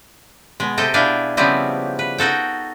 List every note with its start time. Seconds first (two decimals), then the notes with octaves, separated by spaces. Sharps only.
0.60 B2 G#3
0.78 C3 A4 D#5 G5
0.94 B2 D4 E4 G#4 F5 G5
1.37 C#3 F3 G3 B3 C4 E4
1.99 B4
2.18 D#4 F#4 A4 G5